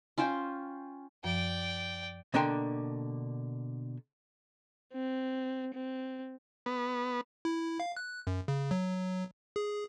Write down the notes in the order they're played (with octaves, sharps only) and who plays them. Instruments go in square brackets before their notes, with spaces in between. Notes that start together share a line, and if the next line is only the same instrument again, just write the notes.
[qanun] C#4 F4 C5 G5
[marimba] F#2 F3 [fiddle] D5 G5
[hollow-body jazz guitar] B2 D3 A#3 D4 G5 C6
[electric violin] C4
C4
[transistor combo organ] B3
[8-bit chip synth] E4
F5
F#6
F#2
C#3
F#3
G#4